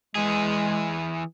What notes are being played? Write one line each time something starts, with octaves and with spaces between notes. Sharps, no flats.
E3 G#3 G#4